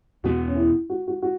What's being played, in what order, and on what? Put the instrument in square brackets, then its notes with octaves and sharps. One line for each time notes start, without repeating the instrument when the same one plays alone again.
[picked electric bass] E2 B2 B3 [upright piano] F#4
[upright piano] C#4
E4
F#4
F#4
F#4